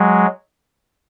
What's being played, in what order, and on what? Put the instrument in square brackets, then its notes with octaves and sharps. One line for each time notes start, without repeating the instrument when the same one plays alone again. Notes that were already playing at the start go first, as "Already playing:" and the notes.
Already playing: [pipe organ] F#3 G#3